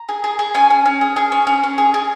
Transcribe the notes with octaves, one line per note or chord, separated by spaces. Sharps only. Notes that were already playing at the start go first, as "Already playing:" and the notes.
Already playing: A#5
G#4
G#4
G#4
C#4 G#5
C#4
C#4
G#4
G#4
C#4
C#4
C#4
G#4
G#4